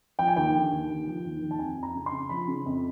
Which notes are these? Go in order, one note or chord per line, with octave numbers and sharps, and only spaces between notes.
F3 G5
G#5
D#2 G5
D3
D#2
D#2
F3
D#2
D#2
A5
F2 G#5
F2
A#5
C#3
C6
C#3
F3 B5
C#3
F2